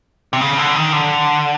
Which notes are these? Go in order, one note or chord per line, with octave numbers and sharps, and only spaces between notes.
C3
C#3
D3
D#3
D3